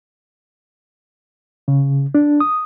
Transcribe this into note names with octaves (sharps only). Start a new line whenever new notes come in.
C#3
D4
D#6